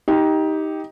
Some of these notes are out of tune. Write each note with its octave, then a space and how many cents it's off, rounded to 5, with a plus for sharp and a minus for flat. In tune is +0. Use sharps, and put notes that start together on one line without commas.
D#4 +15 G4 +0